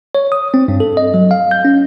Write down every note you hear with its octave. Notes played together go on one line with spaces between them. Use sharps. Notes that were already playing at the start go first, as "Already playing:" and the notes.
C#5
D#6
C4
G2
A4
D#5
F#3
F5
G6
C#4